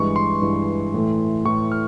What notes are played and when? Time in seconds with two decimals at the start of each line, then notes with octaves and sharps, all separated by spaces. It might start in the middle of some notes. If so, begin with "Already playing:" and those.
Already playing: G2 E3 G#3 C#6
0.16 C6
0.42 G2 E3 G#3
0.94 A2 E3 A3
1.45 A2 E3 A3 C#6
1.72 F6